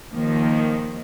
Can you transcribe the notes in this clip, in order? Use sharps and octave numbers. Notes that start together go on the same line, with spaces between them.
D#2 D#3 F3 A#3